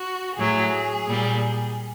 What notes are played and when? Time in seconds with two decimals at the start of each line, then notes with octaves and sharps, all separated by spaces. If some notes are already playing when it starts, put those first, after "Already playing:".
Already playing: F#4
0.35 A2 F#3 G#4
1.07 A#2 G3